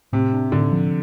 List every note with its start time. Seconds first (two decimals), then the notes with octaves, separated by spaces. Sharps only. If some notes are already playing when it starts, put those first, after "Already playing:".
0.13 A2 C3
0.33 D4
0.52 A2 D3
0.72 F3